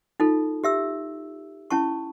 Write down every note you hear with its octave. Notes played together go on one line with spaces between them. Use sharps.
D#4 F4 A4
G4 E5 E6
C#4 E4 A5 C#6